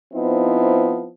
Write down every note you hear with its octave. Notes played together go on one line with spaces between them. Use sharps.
F3 B3 C4 D#4 E4